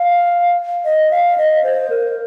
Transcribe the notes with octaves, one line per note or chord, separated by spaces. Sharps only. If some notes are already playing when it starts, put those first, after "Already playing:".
Already playing: F5
D#5
F5
D#5
C5
A#4